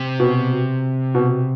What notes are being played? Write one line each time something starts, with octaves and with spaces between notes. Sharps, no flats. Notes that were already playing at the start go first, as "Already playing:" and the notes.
Already playing: C3
B2
B2